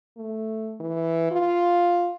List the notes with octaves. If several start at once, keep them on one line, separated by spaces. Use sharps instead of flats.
A3
E3
F4